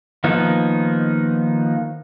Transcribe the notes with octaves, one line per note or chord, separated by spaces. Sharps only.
D#3 F3 A#3 B3 D#4